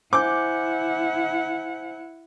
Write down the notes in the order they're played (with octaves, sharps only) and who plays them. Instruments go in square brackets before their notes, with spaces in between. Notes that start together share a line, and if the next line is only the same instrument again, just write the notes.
[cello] E4 F#5 [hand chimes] C5 G#5 G6 [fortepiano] D6